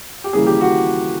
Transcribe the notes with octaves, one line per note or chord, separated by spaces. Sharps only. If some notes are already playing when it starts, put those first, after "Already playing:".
G4
D#2 C#3 E3 G3 A#3 G#4
G4
F#4